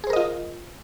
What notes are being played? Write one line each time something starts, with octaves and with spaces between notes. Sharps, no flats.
F4 G#4 A#4 C5 D#5